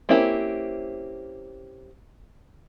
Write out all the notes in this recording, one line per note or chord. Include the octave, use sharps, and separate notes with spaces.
A#3 C4 C#4 E4 G4